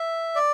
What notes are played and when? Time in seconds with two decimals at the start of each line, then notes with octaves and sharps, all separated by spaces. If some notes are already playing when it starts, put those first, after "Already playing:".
Already playing: E5
0.36 D5